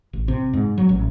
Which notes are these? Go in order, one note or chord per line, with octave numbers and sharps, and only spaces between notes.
A1
C3
G#2
F#3
A1